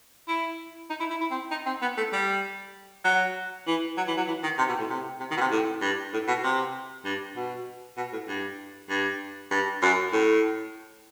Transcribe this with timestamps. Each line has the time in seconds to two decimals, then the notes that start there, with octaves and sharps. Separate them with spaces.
0.28 E4
0.90 D#4
1.00 E4
1.10 E4
1.21 E4
1.31 C4
1.51 D#4
1.66 C4
1.82 B3
1.97 A3
2.13 G3
3.05 F#3
3.67 E3
3.97 F#3
4.08 E3
4.17 F#3
4.28 E3
4.43 D#3
4.58 C3
4.69 B2
4.79 A2
4.90 C3
5.20 C3
5.31 D#3
5.37 B2
5.41 C3
5.51 A2
5.82 G2
6.13 A2
6.28 B2
6.44 C3
7.05 G2
7.36 B2
7.97 B2
8.12 A2
8.28 G2
8.90 G2
9.51 G2
9.82 F#2
10.13 A2